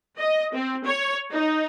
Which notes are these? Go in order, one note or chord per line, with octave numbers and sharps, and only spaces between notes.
D#5
C4
C#5
D#4